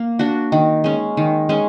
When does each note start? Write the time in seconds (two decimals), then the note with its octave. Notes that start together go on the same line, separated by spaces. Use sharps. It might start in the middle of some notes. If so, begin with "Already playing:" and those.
Already playing: A#3
0.19 D4 F#4
0.52 D#3
0.84 G#3 C#4
1.17 D#3
1.49 G#3 C#4